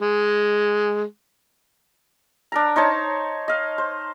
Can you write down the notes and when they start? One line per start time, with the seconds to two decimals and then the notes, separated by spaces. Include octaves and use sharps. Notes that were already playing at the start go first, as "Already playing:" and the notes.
0.01 G#3
2.52 D4 A#4 A#5
2.76 D#4 C5 C#5 A5
3.48 D#5 F5
3.78 C5